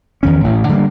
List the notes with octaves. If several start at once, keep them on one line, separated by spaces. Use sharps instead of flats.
E2 D#3 C#4
A1 A2
D3 G3 G#3 A#3